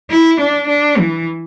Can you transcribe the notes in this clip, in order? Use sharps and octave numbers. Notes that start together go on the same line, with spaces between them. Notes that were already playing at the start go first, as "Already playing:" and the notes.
E4
D4
D4
E3